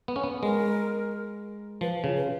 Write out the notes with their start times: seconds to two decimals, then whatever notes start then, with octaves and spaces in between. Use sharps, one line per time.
0.08 B3
0.16 C#4
0.24 B3
0.43 G#3 A#4
1.81 F3 B4
1.99 F4
2.04 C#3
2.16 B4